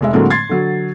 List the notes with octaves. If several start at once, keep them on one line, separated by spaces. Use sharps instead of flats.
F1 G#3 E5
A2 D3 F#3 G#3 A#3 C4
C6 G#6 A6 C7
D3 F#3